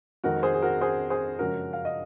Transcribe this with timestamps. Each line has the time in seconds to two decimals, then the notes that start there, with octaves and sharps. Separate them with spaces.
0.24 F2 D#3 G#3 C4 F#4 A#4
0.43 G#4 C5
0.54 G#4
0.62 F#4 A#4
0.81 G#4 C5
1.10 G#4 C5
1.39 F#2 C#3 F3 G#3 C#4 F#4 A#4
1.73 F5
1.85 D#5